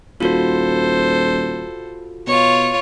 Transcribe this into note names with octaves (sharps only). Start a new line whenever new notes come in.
D#1 F4 F#4 A4 C5
B2 F4 C#5